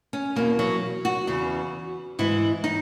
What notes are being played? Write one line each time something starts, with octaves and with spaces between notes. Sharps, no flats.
C#4
E2 B2 A#3
F#3
F#4
E2 C#3 E3
G#2 E3 E4
D#4